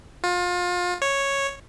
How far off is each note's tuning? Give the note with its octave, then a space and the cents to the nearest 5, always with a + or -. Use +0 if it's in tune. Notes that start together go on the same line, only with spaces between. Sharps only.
F4 +30
C#5 -5